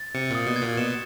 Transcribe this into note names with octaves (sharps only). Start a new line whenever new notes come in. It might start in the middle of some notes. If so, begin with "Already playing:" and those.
Already playing: A6
C3 C#7
A#2 D#6
B2
G#6
A#2
B2 E7